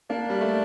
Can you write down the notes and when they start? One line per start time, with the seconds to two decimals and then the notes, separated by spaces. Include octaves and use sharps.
0.10 A#3 D4
0.30 G3
0.41 A3